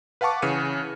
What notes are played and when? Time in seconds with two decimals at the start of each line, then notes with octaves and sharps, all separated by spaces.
0.21 B4 F5 F#5 A5 C#6 D6
0.42 C#3 E3 B4 C#7 D#7